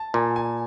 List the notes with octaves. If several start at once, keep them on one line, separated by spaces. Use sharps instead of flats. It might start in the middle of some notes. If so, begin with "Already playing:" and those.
Already playing: A5
A#2 G#5
G#5